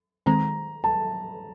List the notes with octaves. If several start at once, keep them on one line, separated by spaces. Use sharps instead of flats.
D#3 G#3 C4 A#5
A5